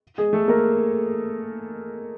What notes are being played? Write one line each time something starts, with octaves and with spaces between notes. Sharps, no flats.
G#3 G#4
A3 A4
A#3 A#4